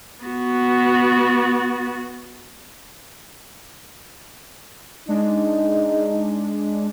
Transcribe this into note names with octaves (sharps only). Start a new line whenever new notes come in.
B3 F#4
G#3 D4 D#4